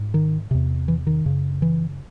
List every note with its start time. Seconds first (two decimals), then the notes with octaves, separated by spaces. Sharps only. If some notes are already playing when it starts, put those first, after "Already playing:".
Already playing: G#2
0.14 D#3
0.51 E2 C3
0.88 E3
1.07 D#3
1.26 F#2 C#3
1.62 E3